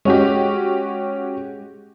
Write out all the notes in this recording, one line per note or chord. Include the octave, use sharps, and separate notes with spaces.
G#3 C#4 F#4 G4